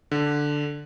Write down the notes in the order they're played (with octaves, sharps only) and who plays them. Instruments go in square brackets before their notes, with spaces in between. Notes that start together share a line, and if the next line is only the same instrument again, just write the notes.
[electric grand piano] D3